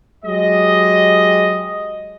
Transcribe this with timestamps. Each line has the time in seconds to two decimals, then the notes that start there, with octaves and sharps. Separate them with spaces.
0.24 F#3 G#3 G4 D#5